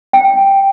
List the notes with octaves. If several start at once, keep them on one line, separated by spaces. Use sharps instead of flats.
G5